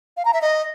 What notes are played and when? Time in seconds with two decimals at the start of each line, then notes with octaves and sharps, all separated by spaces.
0.17 F5
0.25 A#5
0.33 E5
0.42 D#5